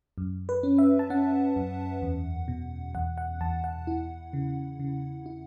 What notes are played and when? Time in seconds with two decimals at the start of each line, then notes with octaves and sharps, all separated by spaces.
0.18 F#2
0.49 B4
0.63 C#4
0.78 E5
0.99 A5
1.10 C#4 F#5
1.56 F#2
2.02 E2
2.48 B2
2.95 E2 F#5
3.18 F#5
3.41 E2 A5
3.64 F#5
3.87 E4
4.33 C#3
4.80 C#3
5.26 E4